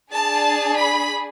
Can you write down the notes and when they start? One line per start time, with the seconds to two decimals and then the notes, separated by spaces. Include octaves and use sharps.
0.12 D4 G#4 A5
0.80 B5